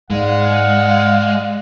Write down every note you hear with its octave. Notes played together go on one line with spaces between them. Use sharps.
G#2 G#3 D5 F5 F#5